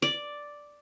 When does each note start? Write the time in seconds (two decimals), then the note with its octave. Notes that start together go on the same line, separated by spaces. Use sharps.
0.02 D5